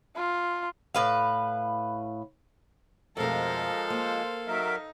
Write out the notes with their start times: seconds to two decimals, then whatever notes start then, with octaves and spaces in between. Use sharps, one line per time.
0.16 F4
0.95 A2 B4 F5
3.17 F2 B2 F3 G#3 A3 A4 A#4 F5
3.90 A#3 C5
4.48 F#3 D#4 A#4 E5